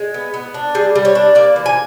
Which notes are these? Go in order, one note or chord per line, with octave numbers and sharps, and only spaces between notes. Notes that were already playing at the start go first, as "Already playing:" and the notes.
Already playing: G#3
B3
B3
D4
G3 G#4
G3
C#5
D4
A#3 D5
E3
G#5